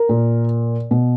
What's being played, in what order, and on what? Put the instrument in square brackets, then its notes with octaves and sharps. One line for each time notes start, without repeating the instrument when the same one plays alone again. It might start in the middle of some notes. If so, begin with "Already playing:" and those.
Already playing: [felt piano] A#4
A#2
B2